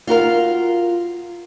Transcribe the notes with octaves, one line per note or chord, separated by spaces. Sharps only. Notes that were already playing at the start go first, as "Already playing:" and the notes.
F4 F#4 A#4 F5